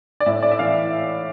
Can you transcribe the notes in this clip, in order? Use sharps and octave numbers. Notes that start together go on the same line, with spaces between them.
D5
A2 E5
D5
E5
E3 F5